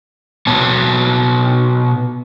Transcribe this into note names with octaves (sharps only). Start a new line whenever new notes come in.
B2 B3 C#5 A5